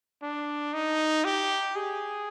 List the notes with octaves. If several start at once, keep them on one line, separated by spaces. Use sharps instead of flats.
D4
D#4
G4
G#4